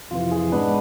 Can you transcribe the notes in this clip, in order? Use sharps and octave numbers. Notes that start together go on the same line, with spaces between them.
F2 C3 E3 F4
G#4
G#2 G#3 B3 D4 B4